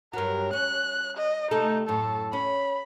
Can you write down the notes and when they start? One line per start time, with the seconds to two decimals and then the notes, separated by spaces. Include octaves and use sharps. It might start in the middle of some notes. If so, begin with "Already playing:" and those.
0.13 G2 F#3 A#4
0.53 C#4 F#6
1.17 D#5
1.51 C3 A3 D#4 A4
1.88 F#2 A2 A4
2.33 C#4 B5